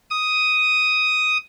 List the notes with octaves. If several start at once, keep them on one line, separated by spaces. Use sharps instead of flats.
D#6